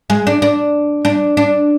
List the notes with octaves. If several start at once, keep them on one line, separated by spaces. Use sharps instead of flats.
G#3
D4
D4
D4
D4